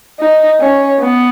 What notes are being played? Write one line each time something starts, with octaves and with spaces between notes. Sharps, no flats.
D#4
C#4
B3